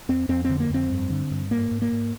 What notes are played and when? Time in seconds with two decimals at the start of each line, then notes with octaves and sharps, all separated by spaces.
0.09 F2 C4
0.29 F2 C4
0.45 D3 C4
0.60 A#3
0.70 F2 C4
0.90 G2
1.10 D3
1.31 G2
1.51 G#2 A#3
1.71 G#2
1.82 A#3
1.92 G#2